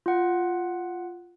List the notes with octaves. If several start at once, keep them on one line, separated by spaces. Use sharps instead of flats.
F4 F#5